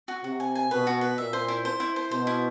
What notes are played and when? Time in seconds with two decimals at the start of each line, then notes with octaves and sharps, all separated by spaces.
0.08 F#4
0.23 C3 F#4
0.40 G#5
0.55 G#5
0.70 B2 B4
0.87 F#4
1.01 B4
1.18 A#2 E5
1.33 C5
1.48 E4
1.65 C5
1.80 E4
1.96 C5
2.11 B2 C5
2.27 E4